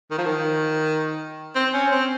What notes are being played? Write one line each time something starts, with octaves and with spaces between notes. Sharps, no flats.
D#3
F3
D#3
C4
C#4
C4